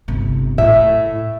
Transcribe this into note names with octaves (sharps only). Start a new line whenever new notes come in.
G1 C3
A2 E5